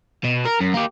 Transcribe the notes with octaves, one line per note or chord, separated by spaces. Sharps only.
B2
A#4
F#2
A#3 G4